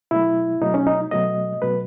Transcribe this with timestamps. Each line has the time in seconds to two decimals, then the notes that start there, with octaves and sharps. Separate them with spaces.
0.11 B2 F#3 A3 E4
0.61 B2 F#3 A3 D#4
0.74 C#4
0.87 D#4
1.11 B2 F#3 A3 D#5
1.62 B2 F#3 A3 B4